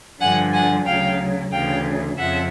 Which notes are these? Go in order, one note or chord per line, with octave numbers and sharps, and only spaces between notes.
G2 D3 F3 F#5 G#5
F#5 G#5
D2 C#3 F#3 F5 G5
D2 C#3 E3 F5 G5
F2 C#3 F3 E5 F#5